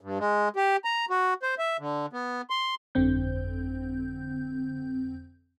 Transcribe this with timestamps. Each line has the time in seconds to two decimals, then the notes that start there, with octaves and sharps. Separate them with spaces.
0.01 G2
0.20 G#3
0.56 G4
0.85 A#5
1.10 F#4
1.43 C5
1.59 E5
1.80 D3
2.13 B3
2.50 C6
2.95 G1 F2 D3 C4 G6